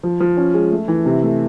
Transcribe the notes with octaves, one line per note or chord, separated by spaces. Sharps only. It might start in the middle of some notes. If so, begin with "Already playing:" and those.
F3
F3
C#4
G#3
A3
E3
C3
A3